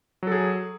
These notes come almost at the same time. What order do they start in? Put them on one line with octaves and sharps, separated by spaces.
F#3 A4 G#4